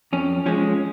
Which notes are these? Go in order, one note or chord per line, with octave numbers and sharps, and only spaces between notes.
F2 C#4
F3 G#3 C#4